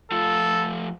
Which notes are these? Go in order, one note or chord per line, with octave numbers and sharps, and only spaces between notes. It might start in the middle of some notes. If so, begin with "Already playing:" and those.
F3 A3 F4 A4